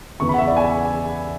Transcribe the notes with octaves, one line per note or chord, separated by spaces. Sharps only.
E2 C#3 E3 C#6
B5
F#5
E5
D5
G#5